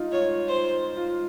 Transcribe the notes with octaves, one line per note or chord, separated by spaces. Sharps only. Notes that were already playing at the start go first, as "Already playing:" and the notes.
Already playing: D#4 F4
F4 C#5
C5
F4